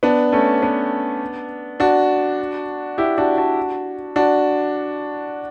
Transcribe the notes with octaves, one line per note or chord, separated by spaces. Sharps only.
B3 D4
A3 C#4
B3 D4
D4 F#4
E4 G4
D4 F#4
D4 F#4
D4 F#4